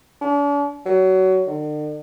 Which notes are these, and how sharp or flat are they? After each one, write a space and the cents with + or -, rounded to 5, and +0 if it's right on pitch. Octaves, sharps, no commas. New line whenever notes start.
D4 -45
F#3 +25
D3 +45